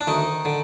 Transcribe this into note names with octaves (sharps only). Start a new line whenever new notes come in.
D4
D2 D#3 D#4
D3